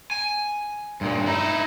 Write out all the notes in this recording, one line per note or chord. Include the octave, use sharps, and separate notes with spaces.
G#5
G2 A#2
D#4 E4